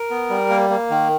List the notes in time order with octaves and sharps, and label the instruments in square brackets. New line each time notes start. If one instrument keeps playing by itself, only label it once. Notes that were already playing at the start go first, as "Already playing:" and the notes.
Already playing: [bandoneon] A#4
B3
G3
A#3
A#3
D#3